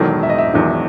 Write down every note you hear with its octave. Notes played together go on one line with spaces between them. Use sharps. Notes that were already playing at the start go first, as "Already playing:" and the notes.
Already playing: E1 E2 D#3 F#3 A4
E5
D#5
E5
E1 E2 D#3 F#3